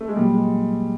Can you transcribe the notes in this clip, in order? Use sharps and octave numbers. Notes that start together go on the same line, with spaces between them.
A3
G#3
A#2 F#3 G3 A#3
G#3